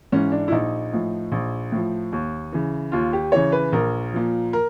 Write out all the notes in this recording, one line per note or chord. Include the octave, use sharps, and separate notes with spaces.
G#2 E3 C#4
D4
E4
A#1 D#4
A2 F3
A#1
A2 F3
D#2
C#3 E3
D#2 F4
G4
C#3 E3 C#5
B4
A#1 A#4
A#2 F3
A#4